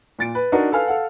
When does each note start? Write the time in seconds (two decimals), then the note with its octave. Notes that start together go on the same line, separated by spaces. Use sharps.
0.19 A#2 A6 D7
0.35 B4
0.52 D4 D#4 F#4 A#4
0.72 A4 B4 F5 G#5 F6
0.88 A4 F5 F#5